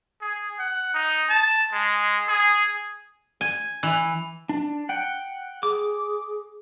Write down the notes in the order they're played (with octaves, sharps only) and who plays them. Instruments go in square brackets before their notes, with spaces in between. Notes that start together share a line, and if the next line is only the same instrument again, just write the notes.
[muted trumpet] G#4
F#5
D#4
A5
G#3
G#4
[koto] G#5
E3
[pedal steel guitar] D4
F#5 G5
[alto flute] G#4 [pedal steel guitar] D6